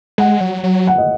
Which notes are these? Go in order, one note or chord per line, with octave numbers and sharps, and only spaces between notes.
G#3 F#5
F#3
F#3
F#5
D#5